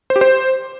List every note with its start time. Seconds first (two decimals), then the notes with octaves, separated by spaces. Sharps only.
0.10 C5
0.16 G4
0.21 C5